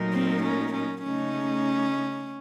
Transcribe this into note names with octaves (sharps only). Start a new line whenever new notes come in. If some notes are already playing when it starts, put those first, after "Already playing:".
Already playing: A#2 F#3 A3 D#4 A#4
C4
C#4
C#4
C#3 A3 C#4 D#4